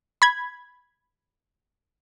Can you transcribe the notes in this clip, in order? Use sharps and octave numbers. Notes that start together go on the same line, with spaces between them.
B5 G#6